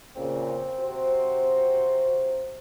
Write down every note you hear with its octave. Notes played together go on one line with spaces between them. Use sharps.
A#2 C#3 C4
C3 F#4 C5